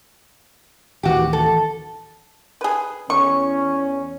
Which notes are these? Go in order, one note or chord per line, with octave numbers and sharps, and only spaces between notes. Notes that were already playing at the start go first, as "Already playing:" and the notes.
D1 D#3 E3 F#4 G4
A4
G#4 B4
E2 C#4 C#6